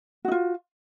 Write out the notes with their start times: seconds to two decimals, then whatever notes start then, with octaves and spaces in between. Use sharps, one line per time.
0.25 F#4
0.28 D#4
0.32 F4